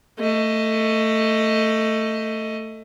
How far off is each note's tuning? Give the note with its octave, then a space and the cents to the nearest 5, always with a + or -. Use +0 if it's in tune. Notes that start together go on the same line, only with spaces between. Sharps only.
A3 +20 D#5 +10